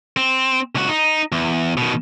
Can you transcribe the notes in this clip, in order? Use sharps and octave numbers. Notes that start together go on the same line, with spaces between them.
C4
C#2 F#4
D#4
E2
B2 D#3